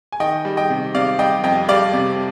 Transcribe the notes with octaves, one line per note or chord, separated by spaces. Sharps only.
G#5
D#3 D#5 G5
G3
D#5 G5
C3
C3 D5 F5
G3 D#5 G5
F2 D#5 G5
G3 D5 F5
C3